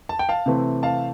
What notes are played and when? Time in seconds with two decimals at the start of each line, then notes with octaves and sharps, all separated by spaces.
0.09 A5
0.19 G5
0.29 F5 A5
0.46 C3 E3 A3 C4
0.83 F5 A5